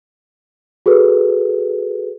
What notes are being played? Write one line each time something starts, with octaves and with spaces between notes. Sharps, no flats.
F#4 G#4 A4 B4